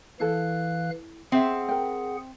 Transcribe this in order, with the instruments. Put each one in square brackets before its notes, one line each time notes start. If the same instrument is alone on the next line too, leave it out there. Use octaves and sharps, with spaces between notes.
[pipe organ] E3 F5 F#6 [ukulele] E4 A4
[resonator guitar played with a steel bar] C4 E5 [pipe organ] G#4 F#5
[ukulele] A#4 G5